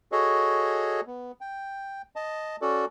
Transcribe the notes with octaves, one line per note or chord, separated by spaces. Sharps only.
F#4 G#4 A4 C#5 D#5
B3
G5
D#5 A5
C#4 F#4 A4 D5